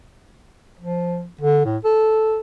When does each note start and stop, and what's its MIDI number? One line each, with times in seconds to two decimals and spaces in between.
0.79 1.26 53
1.41 1.64 50
1.65 1.77 45
1.84 2.40 69